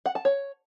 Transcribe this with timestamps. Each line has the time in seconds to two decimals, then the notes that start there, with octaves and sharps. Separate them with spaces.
0.06 F#5
0.15 A5
0.25 C#5